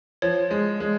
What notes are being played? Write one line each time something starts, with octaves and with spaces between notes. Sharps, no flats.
F3 C#5
G#3
G#3